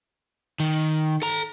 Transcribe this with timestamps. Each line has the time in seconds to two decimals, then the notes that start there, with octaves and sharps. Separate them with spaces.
0.60 D#3
1.22 A4 A#5